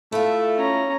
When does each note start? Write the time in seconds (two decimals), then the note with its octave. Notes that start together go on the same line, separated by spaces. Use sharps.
0.12 A3 E4 F4
0.56 C#4 A#5